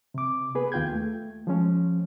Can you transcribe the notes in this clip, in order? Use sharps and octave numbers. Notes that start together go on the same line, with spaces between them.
C3 D6
B3 G#4 B4
D#2 F4 G5 G6 G#6
A3
F3 G#3 C#4